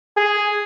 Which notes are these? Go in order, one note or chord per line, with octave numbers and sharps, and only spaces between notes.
G#4